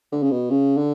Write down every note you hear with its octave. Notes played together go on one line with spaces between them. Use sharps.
D3
C#3
B2
C#3
D3